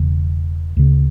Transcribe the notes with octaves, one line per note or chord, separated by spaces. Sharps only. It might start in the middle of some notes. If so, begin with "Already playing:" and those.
Already playing: E1 E2 C#3
D2 C#3